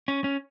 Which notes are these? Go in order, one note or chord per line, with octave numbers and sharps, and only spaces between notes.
C#4
C#4